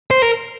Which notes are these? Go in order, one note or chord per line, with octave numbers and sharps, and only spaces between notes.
C5
A#4